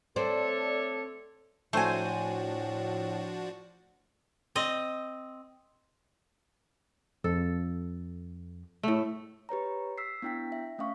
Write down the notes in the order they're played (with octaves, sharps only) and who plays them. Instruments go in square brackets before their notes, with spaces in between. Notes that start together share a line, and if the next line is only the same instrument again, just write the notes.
[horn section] A3 D4 C#5 [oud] C4 [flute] A4 [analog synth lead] D5
[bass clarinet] A2 [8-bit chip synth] F3 D4 F#4 [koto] A3 [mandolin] C5 G#5
[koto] C4 D#5
[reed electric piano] F2 [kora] A4
[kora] A2 A3
[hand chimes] G4 B4 C#5 A#5
E6 B6 C7
B3 D4 E4 G5 B6
E5
A3 C#4 E5 F5 C#6